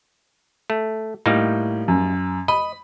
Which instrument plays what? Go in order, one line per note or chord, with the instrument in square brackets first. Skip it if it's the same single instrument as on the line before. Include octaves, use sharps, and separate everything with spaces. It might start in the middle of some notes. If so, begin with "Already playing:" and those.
[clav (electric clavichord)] A3
[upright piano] A2 [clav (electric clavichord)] G3 A#3 D#4
[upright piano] F#2
[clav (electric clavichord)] D#5 [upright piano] B5